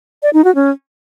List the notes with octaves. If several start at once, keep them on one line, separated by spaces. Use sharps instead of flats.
D5
D#4
F#4
C#4